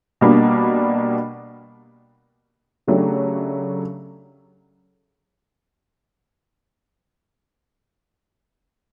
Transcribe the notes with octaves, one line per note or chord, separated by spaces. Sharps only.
B2 G3 A#3 D4
C#3 F#3 A3 D4 G4